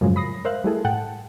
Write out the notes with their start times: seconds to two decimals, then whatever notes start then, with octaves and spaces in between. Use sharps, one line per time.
0.01 F#2 A2 C#3 F3 F#3 G#3
0.16 B5 D#6 A#6 C7
0.45 A#4 C5 E5 F5 F#6
0.64 G3 A3 E4 G#4 A4
0.85 A2 F#5 G5 A5